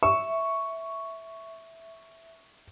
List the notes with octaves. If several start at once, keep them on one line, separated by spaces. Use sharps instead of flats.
E5 C#6